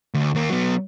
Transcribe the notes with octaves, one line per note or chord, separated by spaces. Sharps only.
D2
D#2 A#3
F#3 B3